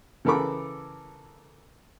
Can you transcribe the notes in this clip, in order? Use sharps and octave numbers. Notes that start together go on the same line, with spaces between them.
C#3 E3 A4 A#4 B5 D6